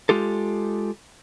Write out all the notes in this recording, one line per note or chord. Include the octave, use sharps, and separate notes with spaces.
G#3 F4 G4 A4